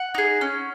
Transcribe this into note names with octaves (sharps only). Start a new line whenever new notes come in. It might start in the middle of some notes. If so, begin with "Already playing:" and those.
Already playing: F#5
D#4 G#4
C#4